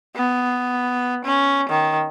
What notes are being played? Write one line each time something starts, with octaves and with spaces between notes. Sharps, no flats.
B3
C#4
D#3